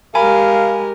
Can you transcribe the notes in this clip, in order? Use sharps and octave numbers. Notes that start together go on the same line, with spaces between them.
G#3 G4 A#4 F5 G#5 B5